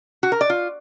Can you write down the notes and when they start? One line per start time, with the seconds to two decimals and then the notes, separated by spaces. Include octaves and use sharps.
0.23 F#4
0.32 A#4
0.41 D5
0.50 F4